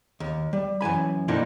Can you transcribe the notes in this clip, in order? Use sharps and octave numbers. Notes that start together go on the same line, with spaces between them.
D#2
G3
F#2 E3 G#5 B5
B2 D3 F3 A#3 D#4 E4